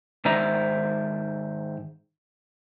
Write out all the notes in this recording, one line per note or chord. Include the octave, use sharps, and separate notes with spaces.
G#2 D#3 C5 D5 E5 A#5